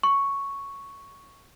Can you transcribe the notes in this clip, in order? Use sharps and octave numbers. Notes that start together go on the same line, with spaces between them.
C#6